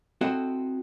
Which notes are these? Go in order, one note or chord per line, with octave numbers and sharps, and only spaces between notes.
C4 E4 F#4 A4 D#5